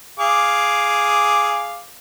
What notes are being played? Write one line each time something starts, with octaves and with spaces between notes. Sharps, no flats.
G#4 F5 D6